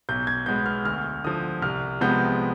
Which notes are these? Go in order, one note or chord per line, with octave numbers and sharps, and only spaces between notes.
B1 G6
G#6
B2 G#3 B3 G6
F6
D2 F6
D3 F3 D#6
C2 F6
C3 F3 G#3 B3 G6